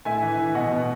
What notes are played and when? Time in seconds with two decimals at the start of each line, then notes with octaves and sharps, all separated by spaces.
0.05 A2 E5 G#5
0.22 E3
0.38 E3
0.54 B2 D#5 F#5
0.71 B2